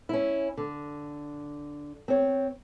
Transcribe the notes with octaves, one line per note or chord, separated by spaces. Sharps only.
C#4 E4
D3
C4 C#5